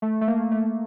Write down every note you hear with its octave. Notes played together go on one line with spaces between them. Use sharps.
A3
A3
A#3
A3